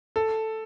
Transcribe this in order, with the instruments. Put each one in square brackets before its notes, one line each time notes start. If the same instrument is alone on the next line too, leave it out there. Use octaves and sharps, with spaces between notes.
[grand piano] A4